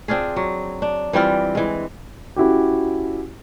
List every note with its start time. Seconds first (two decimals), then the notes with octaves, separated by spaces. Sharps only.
0.08 C4 D4 F4 G#4
0.36 F#3
0.82 D4
1.13 E3 G3 C4 F4
1.55 E3 G#3
2.36 C#4 E4 F#4 G4